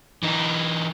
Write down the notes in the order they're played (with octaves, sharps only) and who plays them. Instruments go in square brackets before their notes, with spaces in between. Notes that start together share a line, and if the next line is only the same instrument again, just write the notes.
[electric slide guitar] E3 D#4